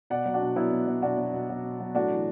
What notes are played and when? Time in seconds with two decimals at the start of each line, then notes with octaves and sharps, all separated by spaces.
0.10 B2 D5 F#5
0.26 F#3
0.34 D4 F#4
0.41 B2
0.56 F#3 B3 E4
0.72 B2
0.88 F#3
1.02 B2 D4 F#4
1.18 F#3
1.33 B2
1.50 F#3
1.64 B2
1.80 F#3
1.95 A2 D4 F#4
2.11 E3